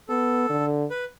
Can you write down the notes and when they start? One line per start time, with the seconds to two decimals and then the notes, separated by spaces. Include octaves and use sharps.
0.09 B3 A4
0.50 D3
0.90 B4